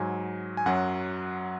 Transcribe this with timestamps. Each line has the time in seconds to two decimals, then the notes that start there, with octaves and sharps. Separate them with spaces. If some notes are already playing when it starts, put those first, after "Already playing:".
Already playing: G#2 F#3 G#5
0.57 G#5
0.66 F#2 F#3 F#5